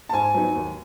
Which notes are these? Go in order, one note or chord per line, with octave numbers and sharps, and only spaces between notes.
A5
G#2 G#5
F#3 B3 D#4
D#2